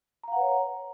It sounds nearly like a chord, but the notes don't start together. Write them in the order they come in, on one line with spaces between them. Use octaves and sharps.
A#5 F5 F#5 B4 C#5